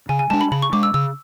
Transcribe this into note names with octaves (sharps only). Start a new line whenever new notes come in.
C#3 G#5
G#5
G#3 D4 A5
B5
C#3 B5
C#6
G#3 D4 D6
E6
C#3 E6